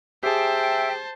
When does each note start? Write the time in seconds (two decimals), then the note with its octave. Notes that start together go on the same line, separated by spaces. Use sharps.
0.23 G4 G#4 C5 E5 G5 A5